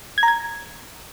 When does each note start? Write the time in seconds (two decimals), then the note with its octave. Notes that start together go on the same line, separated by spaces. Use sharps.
0.18 G#6
0.23 A#5
0.28 G#6